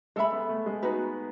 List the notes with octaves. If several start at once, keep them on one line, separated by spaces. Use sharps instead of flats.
G#3 A4 E5 B5
B3
A3
G#3
B3 D#4 F#4 B4